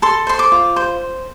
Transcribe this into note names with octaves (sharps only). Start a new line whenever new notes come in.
A4 C6
C5 C6
D6
F4
C5